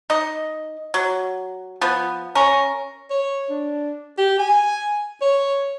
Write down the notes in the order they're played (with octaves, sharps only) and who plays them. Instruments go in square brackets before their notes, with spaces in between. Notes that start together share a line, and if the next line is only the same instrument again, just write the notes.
[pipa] D#4 D#5
F#3
F3 B3
C#4 A#4
[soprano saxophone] C#5
D4
G4
G#5
C#5